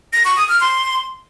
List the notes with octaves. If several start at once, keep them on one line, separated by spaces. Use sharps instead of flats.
A#6
C#6
D#6
F6
C6